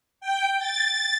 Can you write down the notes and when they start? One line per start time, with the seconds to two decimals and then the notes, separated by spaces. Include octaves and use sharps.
0.21 G5
0.59 A6